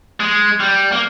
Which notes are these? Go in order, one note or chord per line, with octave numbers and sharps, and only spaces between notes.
G#3
G3
A#3